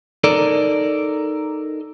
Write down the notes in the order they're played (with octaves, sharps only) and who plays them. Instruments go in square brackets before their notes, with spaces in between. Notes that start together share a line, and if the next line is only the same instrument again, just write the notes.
[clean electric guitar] D#4 A4 A#4 D5